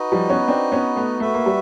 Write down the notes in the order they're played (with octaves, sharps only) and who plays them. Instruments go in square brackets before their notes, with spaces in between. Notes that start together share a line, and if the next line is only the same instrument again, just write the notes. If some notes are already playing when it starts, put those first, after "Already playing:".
Already playing: [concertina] D#4 F#4 B4 D#5
[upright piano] F3 G3
B3 C#4
C4 D4
B3 C#4
A3 B3
[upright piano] A3 [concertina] F#4 B4 E5
[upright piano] A#3
G3